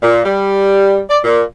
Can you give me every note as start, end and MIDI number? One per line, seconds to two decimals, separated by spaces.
0.02 0.20 46
0.25 0.99 55
1.10 1.19 74
1.24 1.42 46